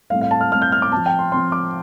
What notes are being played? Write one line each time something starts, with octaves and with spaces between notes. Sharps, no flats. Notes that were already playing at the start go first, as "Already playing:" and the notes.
A2 G3 C4 F5
F5
A5
F6
A2 G3 C4 F6
G6
F6
D6
F3 C4 A5
G5
C6
F3 C4 C6
D6